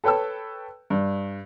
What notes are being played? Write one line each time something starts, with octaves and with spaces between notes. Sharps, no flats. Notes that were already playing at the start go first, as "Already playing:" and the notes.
A4 B4 C#5 G5 A5 E6
G2